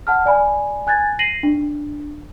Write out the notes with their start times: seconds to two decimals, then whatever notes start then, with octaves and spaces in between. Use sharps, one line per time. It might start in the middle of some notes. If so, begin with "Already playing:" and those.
0.07 F#5 A5 F6
0.26 D5 G#5 B5
0.87 G#5 F#6 G#6 A6
1.19 A#6 C7 D#7 F#7
1.43 D4